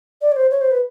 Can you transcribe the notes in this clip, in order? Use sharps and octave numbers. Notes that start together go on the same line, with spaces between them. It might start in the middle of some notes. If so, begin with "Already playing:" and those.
D5
C#5
C5
C#5
C5
B4